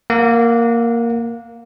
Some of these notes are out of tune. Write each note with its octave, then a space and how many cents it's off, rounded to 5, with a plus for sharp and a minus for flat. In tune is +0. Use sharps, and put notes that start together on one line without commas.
A#3 +0 F#5 -25